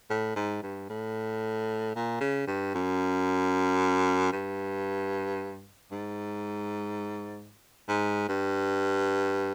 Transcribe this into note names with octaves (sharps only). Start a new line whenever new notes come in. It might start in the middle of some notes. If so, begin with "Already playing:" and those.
A2
G#2
G2
A2
A#2
C#3
G2
F#2
G2
G#2
G#2
G2